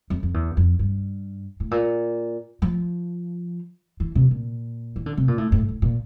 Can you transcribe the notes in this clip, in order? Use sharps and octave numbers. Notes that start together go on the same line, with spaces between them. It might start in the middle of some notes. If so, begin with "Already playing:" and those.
F2
F2
E2
F2
G2
A2
A#2
F3
E3
C3
A#2
E3
D3
C3
A#2
A2
A2
A2
A#2